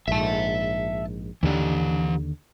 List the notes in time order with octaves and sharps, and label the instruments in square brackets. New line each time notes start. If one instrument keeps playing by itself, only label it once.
[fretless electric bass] A#1 G#2 [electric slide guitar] E5 A5
[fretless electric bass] D#2 D3 A#3 [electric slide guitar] E3 G4